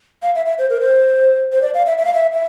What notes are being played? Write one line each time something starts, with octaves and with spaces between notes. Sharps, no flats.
F5
E5
E5
C5
A#4
C5
C5
D5
F5
E5
E5
F5
E5
E5